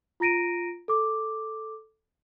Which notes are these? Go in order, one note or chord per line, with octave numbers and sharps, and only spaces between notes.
F4 A#5 A#6 D7 D#7
A4 D6